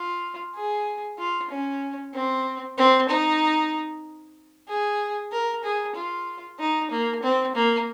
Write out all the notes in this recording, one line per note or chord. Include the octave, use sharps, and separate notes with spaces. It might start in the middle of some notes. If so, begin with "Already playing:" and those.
Already playing: F4
G#4
F4
C#4
C4
C4
D#4
G#4
A#4
G#4
F4
D#4
A#3
C4
A#3